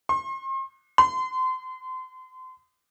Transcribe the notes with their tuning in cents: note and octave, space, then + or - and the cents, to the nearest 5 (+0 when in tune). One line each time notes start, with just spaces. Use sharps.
C6 +40
C6 -30